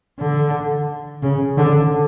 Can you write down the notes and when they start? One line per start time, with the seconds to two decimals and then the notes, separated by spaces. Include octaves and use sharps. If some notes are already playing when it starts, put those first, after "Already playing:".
0.20 D3
1.23 C#3
1.58 D3